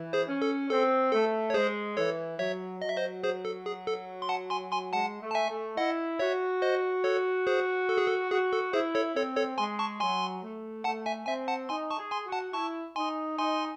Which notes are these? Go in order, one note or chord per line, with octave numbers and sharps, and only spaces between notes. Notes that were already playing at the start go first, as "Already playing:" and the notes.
Already playing: E3
G#4 C5
C#4
A4
C4 A4
A3 A4
C#5
G#3 G#4 C5
E3 A4 C#5
F#3 C#5 E5
F#3 D#5
E5
C5 D#5
G#4 C5
A4
G#4
A4
C6
F#5 A5
G#5 C6
G#5 C6
G#3 F#5 A5
A3
A5
E5 G#5
A3
E4 D#5 F#5
F#4 C#5 E5
C5 D#5
A4 C#5
G#4 C5
A4
G#4
A4
F#4 G#4
A4
E4 G#4 C5
A4 C#5
C4 A4 C#5
A4 C#5
G#3 G#5 C6
A5 C#6
F#3 G#5 C6
A3
A3 F#5 A5
E5 G#5
C4 E5 G#5
F#5 A5
D#4 G#5 C6
A5 C#6
G#4
G#5 C6
F#4
F#5 A5
E4 A5 C#6
D#4 G#5 C6
D#4 G#5 C6